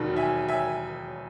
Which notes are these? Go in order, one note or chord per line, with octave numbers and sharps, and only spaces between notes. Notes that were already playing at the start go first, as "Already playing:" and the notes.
Already playing: E1 D#2 D#3 F#3
E5 G#5
E5 G#5